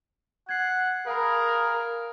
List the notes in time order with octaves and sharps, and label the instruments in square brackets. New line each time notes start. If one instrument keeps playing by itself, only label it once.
[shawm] F#5 [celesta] G#6 C7
[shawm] G#4 [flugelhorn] A#4 [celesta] F5 G#5 B5